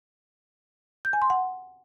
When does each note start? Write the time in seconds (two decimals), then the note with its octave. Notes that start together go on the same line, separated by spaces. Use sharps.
1.05 G6
1.13 G#5
1.22 C6
1.30 F#5